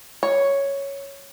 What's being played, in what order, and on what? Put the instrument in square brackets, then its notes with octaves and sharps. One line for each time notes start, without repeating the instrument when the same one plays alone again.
[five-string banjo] C#5